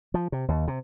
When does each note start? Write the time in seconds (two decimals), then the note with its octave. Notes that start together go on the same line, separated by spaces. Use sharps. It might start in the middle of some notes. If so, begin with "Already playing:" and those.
0.14 F3
0.32 C3
0.48 D#2
0.68 C3